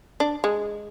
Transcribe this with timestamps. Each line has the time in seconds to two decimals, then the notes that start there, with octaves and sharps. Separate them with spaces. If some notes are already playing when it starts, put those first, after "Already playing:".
0.20 D4
0.44 G#3